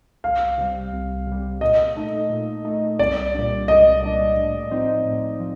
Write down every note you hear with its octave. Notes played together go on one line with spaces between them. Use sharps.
C2 F5
C3 G3
C2
C3 G3
A#2 D#5
A3 D#4
A#2
A3 D#4
C2 D5
A#2 G3 D4
C2 D#5
A#2 G3 D4
A2
F3 C4 D#4
A2
F3